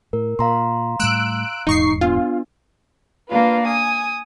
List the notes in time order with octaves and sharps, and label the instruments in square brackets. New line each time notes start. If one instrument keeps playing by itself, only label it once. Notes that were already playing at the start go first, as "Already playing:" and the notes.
[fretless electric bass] A2 [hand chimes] A#4
[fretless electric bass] A#2 [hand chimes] F5 A#5 C6
[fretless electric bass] A2 G3 A3 [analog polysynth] E6 F#6 D7
[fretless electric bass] D#1 E2 G#2 [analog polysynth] D#4 C#6 C7
[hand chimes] B3 D4 [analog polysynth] F4
[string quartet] A#3 D4 F4 B4
G#5 D#6